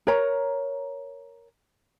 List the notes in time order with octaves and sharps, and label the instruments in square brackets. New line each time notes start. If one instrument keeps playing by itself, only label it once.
[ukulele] A#4 C#5 A#5